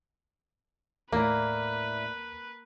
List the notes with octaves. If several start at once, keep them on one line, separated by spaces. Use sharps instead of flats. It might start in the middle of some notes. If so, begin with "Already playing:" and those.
D#2 A2 A#3 E4 B4 D5